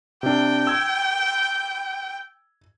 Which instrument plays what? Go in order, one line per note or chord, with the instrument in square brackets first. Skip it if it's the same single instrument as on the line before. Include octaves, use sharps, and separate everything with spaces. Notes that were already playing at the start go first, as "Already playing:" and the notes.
[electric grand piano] C3 D4 [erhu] G5
[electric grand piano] E6 G#6